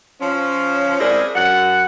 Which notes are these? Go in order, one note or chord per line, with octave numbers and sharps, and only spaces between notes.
F3 C#4
G#3 C4 E4 G#4 A#4 D5
F#2 F#5